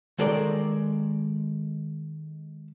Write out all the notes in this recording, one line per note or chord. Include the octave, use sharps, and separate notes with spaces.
D#3 G#3 A4 A#4 D5